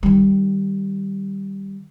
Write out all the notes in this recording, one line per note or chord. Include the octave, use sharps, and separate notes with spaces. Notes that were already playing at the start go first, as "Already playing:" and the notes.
D#3 G3